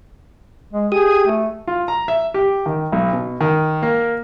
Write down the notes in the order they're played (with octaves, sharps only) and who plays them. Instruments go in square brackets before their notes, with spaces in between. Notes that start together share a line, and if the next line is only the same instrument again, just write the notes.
[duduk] G#3
[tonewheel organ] G4 D#6 [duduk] G#4
[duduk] A3
[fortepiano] F4
A#5
E5
G4
D#3
B1
B2
D#3
A#3